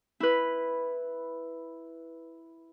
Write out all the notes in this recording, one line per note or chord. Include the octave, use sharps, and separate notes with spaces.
E4 B4